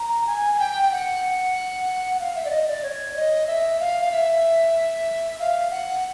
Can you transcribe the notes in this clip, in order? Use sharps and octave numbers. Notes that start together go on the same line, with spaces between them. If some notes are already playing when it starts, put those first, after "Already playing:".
Already playing: A#5
G#5
G#5
G5
G5
F#5
F#5
F5
E5
D5
D#5
D5
C#5
D#5
E5
F5
F5
E5
F5
F#5